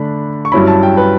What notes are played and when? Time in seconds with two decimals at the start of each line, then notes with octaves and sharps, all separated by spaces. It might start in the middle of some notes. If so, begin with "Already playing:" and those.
Already playing: D3 A3 D4 B5
0.45 C#6
0.52 G2 F#3 C#4 E4 B5
0.67 A5
0.83 G5
0.97 B4